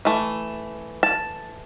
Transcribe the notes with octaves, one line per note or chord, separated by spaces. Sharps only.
E3 A3
A5